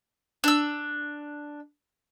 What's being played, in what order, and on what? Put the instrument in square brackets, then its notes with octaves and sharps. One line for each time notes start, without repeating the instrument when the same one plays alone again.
[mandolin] D4 E6